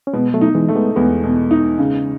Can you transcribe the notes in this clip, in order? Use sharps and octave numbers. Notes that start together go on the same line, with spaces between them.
C#4
B2 G#3 B3
F#3 A3
D#4
E3 G#3
A3
G#3 B3
E2 G#3 B3
B2
D#4
C#3